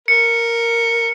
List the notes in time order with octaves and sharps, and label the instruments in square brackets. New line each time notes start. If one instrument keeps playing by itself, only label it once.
[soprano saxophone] A#4 [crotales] C#7